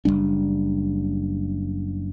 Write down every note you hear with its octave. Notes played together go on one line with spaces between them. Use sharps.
F#1 F2 G3 D4